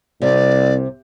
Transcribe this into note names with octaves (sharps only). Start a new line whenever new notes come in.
C2 C3 D5